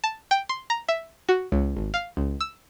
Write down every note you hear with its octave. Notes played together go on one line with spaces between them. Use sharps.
A5
G5
C6
A#5
E5
F#4
C#2
G#1
F5
C#2
E6